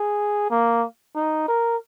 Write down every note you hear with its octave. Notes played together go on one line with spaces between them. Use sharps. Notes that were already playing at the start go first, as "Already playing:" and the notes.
Already playing: G#4
A#3
D#4
A#4